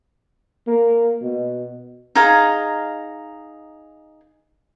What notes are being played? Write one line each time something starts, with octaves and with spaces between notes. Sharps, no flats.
A#3
B2
D#4 G#4 F5 A#5